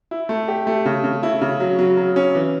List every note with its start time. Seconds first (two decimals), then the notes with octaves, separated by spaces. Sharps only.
0.11 E4
0.29 A3
0.48 G4
0.67 A3
0.85 C#3
1.04 C#3
1.23 E4
1.42 C#3
1.60 F#3
1.79 F#3
1.97 F#3
2.16 C#4
2.35 E3